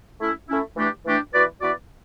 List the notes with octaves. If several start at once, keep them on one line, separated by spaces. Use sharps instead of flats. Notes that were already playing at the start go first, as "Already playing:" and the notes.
A3 C#4 E4
A3 C#4 E4
E3 A3 D4 G4
E3 A3 D4 G4
E3 B3 F#4 B4 D5
E3 B3 F#4 B4 D5